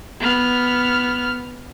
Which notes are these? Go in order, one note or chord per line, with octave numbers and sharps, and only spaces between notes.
B3 F6